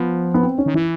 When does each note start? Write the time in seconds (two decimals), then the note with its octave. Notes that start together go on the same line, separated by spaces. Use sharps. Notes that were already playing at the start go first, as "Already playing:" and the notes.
Already playing: F3 B3
0.34 B3
0.42 C4
0.58 C#4
0.66 D#3
0.74 E3 E4